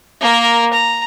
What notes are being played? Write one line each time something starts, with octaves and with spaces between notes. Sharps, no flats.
A#3 A#4
A#5